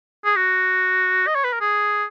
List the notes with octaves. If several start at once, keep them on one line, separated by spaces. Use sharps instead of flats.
G#4
F#4
D#5
C#5
B4
A#4
G#4